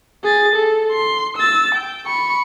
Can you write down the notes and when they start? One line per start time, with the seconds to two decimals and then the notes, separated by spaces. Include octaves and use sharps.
0.24 G#4 A6
0.56 A4
0.91 C6
1.37 E6 A6
1.75 G5
2.06 B5 C#6